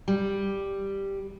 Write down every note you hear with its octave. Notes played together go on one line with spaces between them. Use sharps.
G3